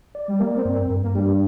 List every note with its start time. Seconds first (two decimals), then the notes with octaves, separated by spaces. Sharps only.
0.15 D5
0.28 G3
0.40 A#3 A#4
0.57 C4
0.65 G2
0.74 C4
0.90 G2
1.03 A#3
1.15 G3 D4
1.28 G3